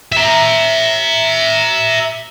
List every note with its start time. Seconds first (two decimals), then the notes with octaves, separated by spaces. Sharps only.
0.12 E5 A#5